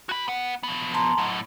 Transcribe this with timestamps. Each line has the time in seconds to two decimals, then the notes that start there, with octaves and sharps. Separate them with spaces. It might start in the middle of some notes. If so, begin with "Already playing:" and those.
0.09 F#4 B5
0.28 B3 F#5
0.63 F3 B3
0.94 A5 A#5 C6
1.18 A2 F#3